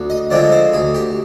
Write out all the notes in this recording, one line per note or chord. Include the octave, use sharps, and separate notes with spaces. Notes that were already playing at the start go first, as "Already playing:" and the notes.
Already playing: D2
D#5
D3 F3 G#3 C4 D5
C5
D2 G#4
G4